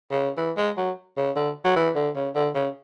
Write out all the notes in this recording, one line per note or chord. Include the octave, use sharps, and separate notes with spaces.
C#3
E3
G#3
F#3
C#3
D3
F#3
E3
D3
C#3
D3
C#3